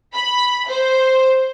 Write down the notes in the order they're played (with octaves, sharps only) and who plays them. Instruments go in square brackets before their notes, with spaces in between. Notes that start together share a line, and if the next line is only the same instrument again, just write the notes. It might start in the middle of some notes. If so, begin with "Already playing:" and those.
[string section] B5
C5